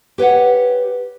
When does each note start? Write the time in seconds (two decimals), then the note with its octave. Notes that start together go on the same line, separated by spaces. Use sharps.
0.18 G4 B4 C#5 F#5